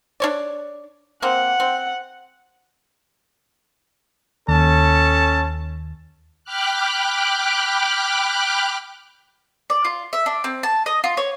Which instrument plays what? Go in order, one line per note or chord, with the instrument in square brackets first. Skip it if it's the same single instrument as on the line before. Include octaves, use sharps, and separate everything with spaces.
[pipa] D4 C#5 D5
[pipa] A#3 C4 [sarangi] F#5
[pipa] C4
[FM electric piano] D#2 [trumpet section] C#4 A4 A5
[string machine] G5 B5 D6 F6 F#6
[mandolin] D5
F4
E5
D4
C4
A5
D#5
F4
C#5